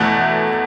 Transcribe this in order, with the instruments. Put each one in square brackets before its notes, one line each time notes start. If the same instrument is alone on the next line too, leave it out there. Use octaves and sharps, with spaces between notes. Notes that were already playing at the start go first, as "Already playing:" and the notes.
Already playing: [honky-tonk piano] E2 B2 A3 F#5